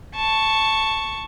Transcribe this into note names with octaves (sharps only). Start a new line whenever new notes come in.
A5 C#6